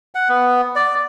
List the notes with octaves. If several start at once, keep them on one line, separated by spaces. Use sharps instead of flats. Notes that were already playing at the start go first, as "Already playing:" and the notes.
F#5
B3
D5